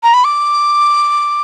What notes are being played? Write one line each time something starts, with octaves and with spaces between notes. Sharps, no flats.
A#5
B5
D6